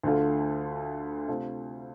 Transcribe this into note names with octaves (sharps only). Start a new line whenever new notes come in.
D2 D3 A3 F4
C3 A3 F4